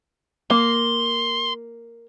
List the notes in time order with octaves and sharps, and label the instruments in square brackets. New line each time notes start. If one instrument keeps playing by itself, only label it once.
[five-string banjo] A#3 [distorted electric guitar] C6